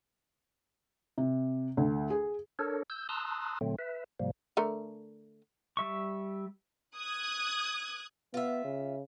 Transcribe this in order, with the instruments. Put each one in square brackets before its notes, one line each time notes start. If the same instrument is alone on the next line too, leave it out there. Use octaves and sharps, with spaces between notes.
[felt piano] C3
D2
G#4
[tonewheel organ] D4 A4 A#4 C#5
E6 G6
A5 A#5 C6 D#6 E6 F#6
A#2 D3 F#3 A3 C4
B4 E5
G#2 C3 F3 G3 A#3
[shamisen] D3 A3 A#4
[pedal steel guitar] G3 E5 C#6
[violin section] D#6 F#6 G#6
[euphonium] B3 [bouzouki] F4 E5
[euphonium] C#3